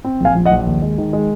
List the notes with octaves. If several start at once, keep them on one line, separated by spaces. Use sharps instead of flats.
C4
A#1 F5 G#5
F3
D#5 F#5
A#1
D#2
G#3
D#3
G#3